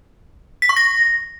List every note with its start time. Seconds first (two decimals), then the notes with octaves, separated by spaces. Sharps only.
0.62 B6
0.69 C#6
0.76 A#6